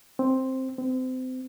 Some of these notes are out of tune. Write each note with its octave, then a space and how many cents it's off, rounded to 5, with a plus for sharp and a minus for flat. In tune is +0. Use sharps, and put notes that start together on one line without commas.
C4 +5
C4 -30